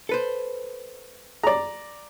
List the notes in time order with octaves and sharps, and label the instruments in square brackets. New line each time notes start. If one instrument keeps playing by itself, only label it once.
[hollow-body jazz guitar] A4 B4 C5
[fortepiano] D5 A#5